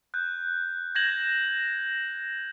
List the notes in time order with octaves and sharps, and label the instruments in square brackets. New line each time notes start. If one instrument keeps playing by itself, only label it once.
[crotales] F#6 G6
G6 G#6 A#6 E7 F#7